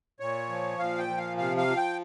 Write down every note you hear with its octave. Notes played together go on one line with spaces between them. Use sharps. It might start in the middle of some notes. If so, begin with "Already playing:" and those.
A#2 C#5
F3
A#2 F5
G5
F3
F5
C3 F5
F5
F3
G5